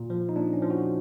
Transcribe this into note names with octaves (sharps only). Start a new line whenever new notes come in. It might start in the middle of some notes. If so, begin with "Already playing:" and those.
Already playing: A#2
F3
D#4
A#2 D4
C#4
F3
F#4